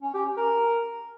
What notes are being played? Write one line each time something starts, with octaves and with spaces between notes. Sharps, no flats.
C#4
G4
C#4
A#4